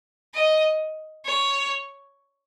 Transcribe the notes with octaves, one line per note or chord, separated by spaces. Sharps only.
D#5
C#5